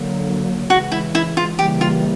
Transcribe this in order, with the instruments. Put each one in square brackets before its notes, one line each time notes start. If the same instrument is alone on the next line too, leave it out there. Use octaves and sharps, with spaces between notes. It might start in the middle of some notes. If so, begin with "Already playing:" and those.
Already playing: [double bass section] D3 F#3 A#3
[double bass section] C#3 [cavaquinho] F#4
[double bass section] E3 G#3
[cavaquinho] E4
E4
F4
[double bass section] C#3 E3 G3 A#3 [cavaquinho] G4
[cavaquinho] F4